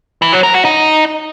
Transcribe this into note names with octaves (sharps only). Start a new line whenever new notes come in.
E3
F#3
A#4
F#4
D#4